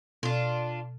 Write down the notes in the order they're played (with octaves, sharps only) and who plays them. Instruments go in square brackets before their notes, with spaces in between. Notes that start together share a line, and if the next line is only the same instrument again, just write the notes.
[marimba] B2 [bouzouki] D4 F4